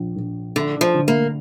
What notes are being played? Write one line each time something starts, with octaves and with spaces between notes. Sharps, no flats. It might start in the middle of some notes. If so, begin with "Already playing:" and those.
Already playing: A#1
A#1
D3 D4
F3
D3
A#3